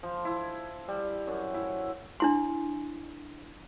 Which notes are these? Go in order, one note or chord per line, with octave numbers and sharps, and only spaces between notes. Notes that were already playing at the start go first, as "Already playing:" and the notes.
F3
E4
G3
F#2
E4
D4 E4 C6